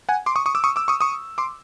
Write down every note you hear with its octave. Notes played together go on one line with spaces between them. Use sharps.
F#5 G#5
C6 D6
C#6 D#6
C#6 D#6
D6 E6
C#6 D#6
D6 E6
C#6 D#6
C#6 D#6
C6 D6